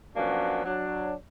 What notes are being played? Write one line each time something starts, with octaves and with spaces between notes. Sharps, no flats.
F3 F#3 A#3 B3 C#4 D4
F#3 D4